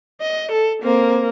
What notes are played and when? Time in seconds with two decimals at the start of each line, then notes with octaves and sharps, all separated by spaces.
0.22 D#5
0.52 A4
0.83 A#3 C4